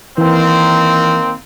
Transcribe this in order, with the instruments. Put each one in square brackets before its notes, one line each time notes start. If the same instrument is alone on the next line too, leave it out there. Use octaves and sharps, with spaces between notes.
[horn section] D#3 A#3 C4 [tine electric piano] E3